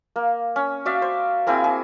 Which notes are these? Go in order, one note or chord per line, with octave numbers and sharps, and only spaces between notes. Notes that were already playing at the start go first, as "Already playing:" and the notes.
A#3
C#4
F#4 D5 E5 F5
C5
A#3 C4 E4 G#4
G#4